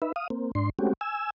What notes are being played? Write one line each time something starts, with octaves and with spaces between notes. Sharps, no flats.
D#4 B4 E5
F5 D#6
A#3 C4
G#2 D4 C6
G#3 A3 C4 C#4 F#4 G4
G#5 E6